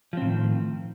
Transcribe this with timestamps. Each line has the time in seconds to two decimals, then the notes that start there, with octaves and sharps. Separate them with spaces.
0.13 F3
0.17 C4
0.21 A2
0.26 D#3